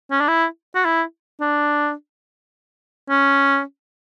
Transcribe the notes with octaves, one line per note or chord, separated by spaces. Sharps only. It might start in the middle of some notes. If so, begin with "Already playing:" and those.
C#4
D4
E4
F#4
E4
D4
C#4